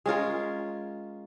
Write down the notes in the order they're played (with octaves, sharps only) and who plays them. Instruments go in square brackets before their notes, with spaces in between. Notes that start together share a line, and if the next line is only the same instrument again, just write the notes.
[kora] G#3 C#4 F4 A#4